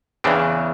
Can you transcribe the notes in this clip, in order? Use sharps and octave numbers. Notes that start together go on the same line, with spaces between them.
E2 C#3 E3 C4 D4